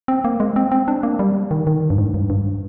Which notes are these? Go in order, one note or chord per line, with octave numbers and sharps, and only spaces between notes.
C4
A#3
G#3
C4
C4
D4
A#3
G3
D#3
D#3
G2
G#2
G2
G2